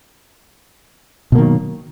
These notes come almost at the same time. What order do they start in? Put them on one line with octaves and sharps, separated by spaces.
B2 A#3 D#3 F#3